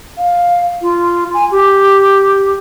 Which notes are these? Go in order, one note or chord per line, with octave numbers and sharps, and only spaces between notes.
F5
F4
G#5
G4